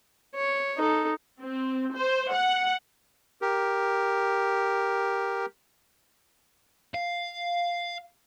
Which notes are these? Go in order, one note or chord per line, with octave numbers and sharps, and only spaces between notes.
C#5
D#4 A4
C4
C5
F#5
G4 A#4
F5